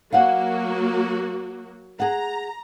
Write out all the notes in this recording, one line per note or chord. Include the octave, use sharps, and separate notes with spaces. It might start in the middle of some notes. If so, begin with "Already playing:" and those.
F#3 A#3 F#4 F5 F#5
G#4 F#5 A#5